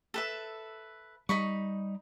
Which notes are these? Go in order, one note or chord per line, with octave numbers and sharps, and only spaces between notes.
A4 B4 E5
G3 D#4 B5 C#6